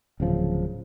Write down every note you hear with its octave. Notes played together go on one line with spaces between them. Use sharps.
D1 C#3 F3